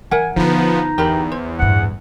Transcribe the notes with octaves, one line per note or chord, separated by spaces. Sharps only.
E3 A#4 E5 F#5 G#5
D3 F3 B3 D4 D#4
E2 G4 A#4 B5
C5
A1 G2 F#5